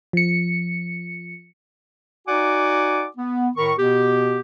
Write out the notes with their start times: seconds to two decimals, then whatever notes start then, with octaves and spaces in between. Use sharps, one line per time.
0.13 F3 C#7
2.28 D#4 F#4 D5 F#5 G#5 D6
3.17 B3
3.57 A2 D#3 A#4 B5 C#6
3.78 B2 B3 G4